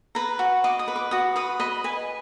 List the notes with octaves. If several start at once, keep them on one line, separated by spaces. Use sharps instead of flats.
B4 A#5
F#4
D#5 D6
D#6
B4
D6
F#4 D#6
B4 D#6
D#5 B5
B4 G#5